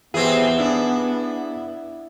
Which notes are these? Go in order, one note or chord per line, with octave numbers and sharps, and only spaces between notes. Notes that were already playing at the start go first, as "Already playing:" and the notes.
E3 B3 C4 E4 G4 G#4
D4 E4 G#4